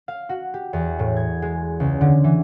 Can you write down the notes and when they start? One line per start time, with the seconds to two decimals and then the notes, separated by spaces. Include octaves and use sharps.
0.08 F5
0.29 F#4
0.54 G4
0.73 E2
0.99 A2
1.17 G#6
1.42 G#3
1.80 C#2
2.01 D3
2.24 E3